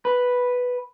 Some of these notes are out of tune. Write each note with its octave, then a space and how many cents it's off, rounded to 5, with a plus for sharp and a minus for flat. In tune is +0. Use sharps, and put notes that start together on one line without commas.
B4 +0